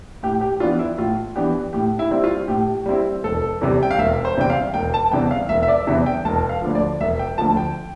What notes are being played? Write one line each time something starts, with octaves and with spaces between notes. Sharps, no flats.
A2 G4
G4
E3 B3 D4 F4
E4
A2 F4
E3 B3 D4 G4
A2 G4
E4
G3 C4 E4
F4
A2 G4
G3 C4 E4
E1 A4
E2 C3 G3
G5
F5
E1 E5
C5
E2 C3 G3 G5
F5
E1 G5
A5
E2 C3 G3 B3 G5
F5
E1 E5
E5
D5
E2 C3 G3 B3 E5
G5
E1 A5
F5
D2 D3 F3
D5
E1 E5
G5
D2 D3 F3 A5
G5